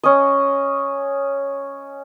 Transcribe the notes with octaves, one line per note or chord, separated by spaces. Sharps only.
C#4 D#5